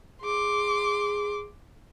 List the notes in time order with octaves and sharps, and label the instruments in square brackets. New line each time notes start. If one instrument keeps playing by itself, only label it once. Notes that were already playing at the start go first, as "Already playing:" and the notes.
[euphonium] G#4 [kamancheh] C6 D6